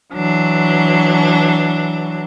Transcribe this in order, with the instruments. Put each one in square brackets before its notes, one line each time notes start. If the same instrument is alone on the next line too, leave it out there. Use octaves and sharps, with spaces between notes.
[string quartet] E3 F#3 D4